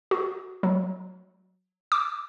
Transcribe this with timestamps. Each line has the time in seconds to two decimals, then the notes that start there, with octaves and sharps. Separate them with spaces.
0.11 F#4
0.63 F#3
1.92 D6